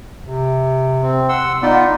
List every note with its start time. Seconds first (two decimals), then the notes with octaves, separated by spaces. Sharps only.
0.24 C3
1.02 C4
1.29 F#5 C6 E6
1.62 B3 D#4 F4 D5